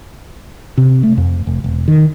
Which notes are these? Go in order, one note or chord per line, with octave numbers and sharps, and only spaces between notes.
C3
A3
F2
F1
E1
D#3